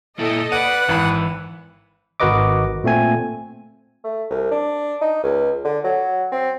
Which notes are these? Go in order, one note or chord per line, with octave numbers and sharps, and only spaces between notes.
A#2 E4 A4 D#5
B4 D5 F#5 D#7
G#1 E3 B5
G#1 F#4 A#4 B4 D#5 D6
A#2 A3 C4 G#5
A3
C2
D4
D#4
C#2
D3
F#3
C4